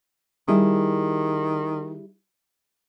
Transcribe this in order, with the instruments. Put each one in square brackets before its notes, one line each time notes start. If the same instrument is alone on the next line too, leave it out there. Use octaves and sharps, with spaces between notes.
[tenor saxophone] D#3 [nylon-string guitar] G3 E4 G#4